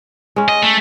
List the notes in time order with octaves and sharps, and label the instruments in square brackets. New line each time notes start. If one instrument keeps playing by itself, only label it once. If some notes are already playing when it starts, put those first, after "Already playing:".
[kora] G#3 C#4
[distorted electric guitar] D#5
A3